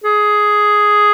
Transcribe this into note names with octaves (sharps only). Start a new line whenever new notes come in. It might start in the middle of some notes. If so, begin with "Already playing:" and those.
G#4